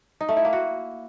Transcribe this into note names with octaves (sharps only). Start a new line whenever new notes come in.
D#4
A3
E4
A#3
F#4